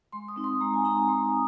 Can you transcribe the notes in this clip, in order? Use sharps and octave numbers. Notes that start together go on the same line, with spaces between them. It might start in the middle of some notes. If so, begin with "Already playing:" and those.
G#3 C6
D#6
C4 D#4
C6
G#3 A#5
G#5
C4 D#4 A#5
G#3 C6
D#6
C4